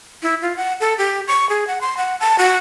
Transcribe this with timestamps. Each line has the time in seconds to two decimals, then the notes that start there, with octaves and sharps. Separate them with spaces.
0.23 E4
0.42 F4
0.57 F#5
0.80 A4
0.98 G4
1.28 C#6
1.49 G#4
1.67 F#5
1.81 C6
1.97 F#5
2.20 A5
2.38 F#4